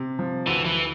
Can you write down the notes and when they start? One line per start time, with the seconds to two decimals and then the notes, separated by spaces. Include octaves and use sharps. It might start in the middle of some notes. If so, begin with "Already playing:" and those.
Already playing: C3
0.19 F3
0.47 D2 E3
0.65 E3